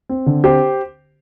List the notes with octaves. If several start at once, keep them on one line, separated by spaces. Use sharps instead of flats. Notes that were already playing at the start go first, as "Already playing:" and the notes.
C4
D3
C4 G4 C5